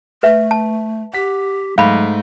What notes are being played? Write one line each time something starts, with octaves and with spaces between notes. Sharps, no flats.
A3 B4 E5
A5
G4 F#5 B6
G#2 F#3 A3 F5 B5